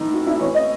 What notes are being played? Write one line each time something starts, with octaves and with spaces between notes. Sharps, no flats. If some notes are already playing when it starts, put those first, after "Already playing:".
Already playing: A2 E3 D#4
F#4
E4
A2 E3 C#5
D#5